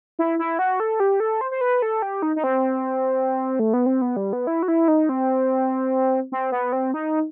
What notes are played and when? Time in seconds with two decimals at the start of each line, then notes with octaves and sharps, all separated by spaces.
0.19 E4
0.39 E4
0.59 F#4
0.80 A4
1.00 G4
1.20 A4
1.41 C5
1.51 C5
1.61 B4
1.82 A4
2.02 G4
2.22 D#4
2.36 D#4
2.44 C4
3.59 A3
3.73 B3
3.86 C4
4.02 B3
4.17 G3
4.33 B3
4.47 E4
4.63 F#4
4.68 E4
4.88 D#4
5.09 C4
6.32 C4
6.52 B3
6.73 C4
6.94 D#4